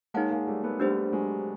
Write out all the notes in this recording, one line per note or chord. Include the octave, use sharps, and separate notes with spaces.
G#3 A#3 D#4 G#4 C#5 F#5 A5
G#3 A#3
G3 A3
A3 B3
G3 A3 D4 G4 C5
F#3 G#3